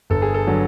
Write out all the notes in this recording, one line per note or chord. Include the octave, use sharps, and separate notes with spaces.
G1 A4
G#4
A4
D3 F#3